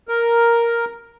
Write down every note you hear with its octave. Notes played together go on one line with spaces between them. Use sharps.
A#4